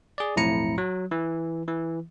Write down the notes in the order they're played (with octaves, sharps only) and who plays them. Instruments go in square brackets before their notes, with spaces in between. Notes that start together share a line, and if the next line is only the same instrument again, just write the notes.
[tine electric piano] G#4 D5
B1 F2 A2 E4 A#5 C#7
F#3
E3
E3